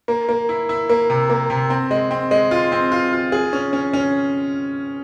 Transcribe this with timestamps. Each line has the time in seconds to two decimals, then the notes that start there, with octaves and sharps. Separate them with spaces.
0.08 A#3
0.29 A#3
0.49 E4
0.69 E4
0.89 A#3
1.10 C3
1.30 A#3
1.50 C3
1.70 C4
1.91 G#3
2.11 C4
2.31 G#3
2.51 F4
2.72 C4
2.92 F4
3.13 F4
3.32 G#4
3.53 C#4
3.73 C#4
3.93 C#4